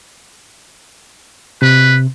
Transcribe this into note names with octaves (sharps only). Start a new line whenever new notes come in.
C3 B4